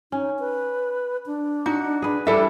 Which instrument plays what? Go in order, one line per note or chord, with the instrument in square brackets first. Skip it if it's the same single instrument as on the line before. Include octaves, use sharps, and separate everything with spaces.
[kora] C#4 [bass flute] D#4
[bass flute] B4
D4
[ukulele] D#4 [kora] F#4
[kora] G#4 B4
[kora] G3 D4 E4 [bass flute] G4 [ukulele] A4 E5